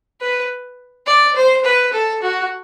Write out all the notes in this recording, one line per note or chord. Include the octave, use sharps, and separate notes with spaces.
B4
D5
C5
B4
A4
F#4